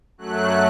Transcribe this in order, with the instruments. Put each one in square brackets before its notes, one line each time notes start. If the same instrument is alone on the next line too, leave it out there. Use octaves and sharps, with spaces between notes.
[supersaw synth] F#2 F#3 A3 F#6